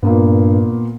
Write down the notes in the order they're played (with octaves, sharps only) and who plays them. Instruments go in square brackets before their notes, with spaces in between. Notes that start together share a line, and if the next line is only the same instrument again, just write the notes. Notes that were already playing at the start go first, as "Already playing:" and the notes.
[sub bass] G2 [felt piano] A#2 A#3 B3